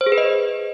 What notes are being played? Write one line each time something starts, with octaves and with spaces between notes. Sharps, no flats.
C5
G#4
B4
D#5